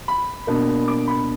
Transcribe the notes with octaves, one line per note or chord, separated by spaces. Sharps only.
B5
B2 A#3 D4
D6
B5